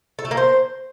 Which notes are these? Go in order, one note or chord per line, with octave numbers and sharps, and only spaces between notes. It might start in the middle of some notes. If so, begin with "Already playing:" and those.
A4
A3
A#3
C5